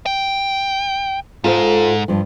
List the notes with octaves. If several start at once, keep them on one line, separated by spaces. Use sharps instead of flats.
G5
G#2 F4 A4 C5
G2 F3